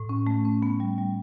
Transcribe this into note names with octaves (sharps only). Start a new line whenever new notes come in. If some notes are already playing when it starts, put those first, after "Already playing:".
Already playing: A2
C#4
A3
C#4
B3
G3
G3